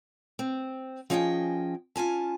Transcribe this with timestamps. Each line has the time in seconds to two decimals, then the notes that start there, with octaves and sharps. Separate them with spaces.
0.39 C4
1.10 F3 C#4 G#4 D#5 F#5 G5
1.96 C#4 F4 G#5 A5